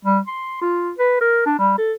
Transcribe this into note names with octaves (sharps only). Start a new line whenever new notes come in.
G3
C6
F4
B4
A#4
D4
G3
A4